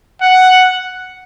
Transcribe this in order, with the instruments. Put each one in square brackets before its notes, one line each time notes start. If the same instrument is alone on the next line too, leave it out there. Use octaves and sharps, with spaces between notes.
[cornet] F#5